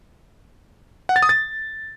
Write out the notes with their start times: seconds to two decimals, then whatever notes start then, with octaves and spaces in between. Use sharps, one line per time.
1.09 F#5
1.16 A6
1.23 D#6
1.29 A6